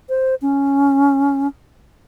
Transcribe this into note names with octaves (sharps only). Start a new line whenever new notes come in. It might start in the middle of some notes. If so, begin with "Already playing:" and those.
C5
C#4